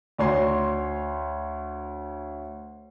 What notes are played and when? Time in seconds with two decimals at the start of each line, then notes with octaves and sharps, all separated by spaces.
0.18 D2 C#5 C6